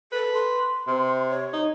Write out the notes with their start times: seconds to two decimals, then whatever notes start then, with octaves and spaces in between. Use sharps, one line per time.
0.12 A4 B4
0.34 C6
0.87 C3
1.30 C#5
1.53 D#4